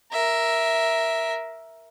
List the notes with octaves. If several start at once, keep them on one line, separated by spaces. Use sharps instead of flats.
A#4 E5